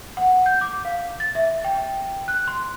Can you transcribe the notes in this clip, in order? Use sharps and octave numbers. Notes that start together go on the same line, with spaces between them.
F#5
G6
D6
F5
A6
E5
G5
F#6
C6